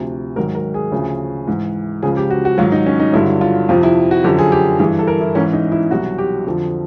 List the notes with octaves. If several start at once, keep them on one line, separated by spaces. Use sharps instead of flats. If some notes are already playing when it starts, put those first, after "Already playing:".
Already playing: D2 C3 F3
G#2 D#3 F#3 A#4
A#4
G#4
D2 C#3 F3
G#2 E3
C#2 C#3 F3 G#4
G4
F#4
F#4
G#2 D#3 F#3 F4
D#4
C#4
D#4
G2 D3 F#3 E4
F4
F2 C3 F3 F4
E4
F#4
F#2 D3 F3 G4
G#4
G4
G2 E3 G#4
A4
A#4
E4
G#2 E3 C#4
D#4
E4
C2 B2 F#3 F#4
G4
F2 D3 F3